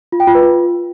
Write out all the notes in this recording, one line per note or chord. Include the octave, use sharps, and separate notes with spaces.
F4
G5
F4
B4
F4